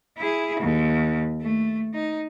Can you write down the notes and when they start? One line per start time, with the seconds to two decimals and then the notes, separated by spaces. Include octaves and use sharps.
0.18 E4 G#4
0.60 D#2
1.42 A3
1.94 D#4